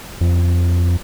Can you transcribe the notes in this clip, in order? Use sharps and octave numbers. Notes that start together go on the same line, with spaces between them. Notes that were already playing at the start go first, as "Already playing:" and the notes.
F2